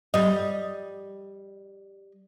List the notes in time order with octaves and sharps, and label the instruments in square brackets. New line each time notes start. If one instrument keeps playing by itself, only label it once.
[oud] G3 D#5